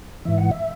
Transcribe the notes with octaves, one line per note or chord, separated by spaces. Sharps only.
G#2 E3 E5
F#5
E5